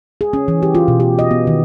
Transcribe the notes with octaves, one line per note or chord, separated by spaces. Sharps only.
G#4
C#4
E3
G4
F4
B2
G4
D#5
B3
D#3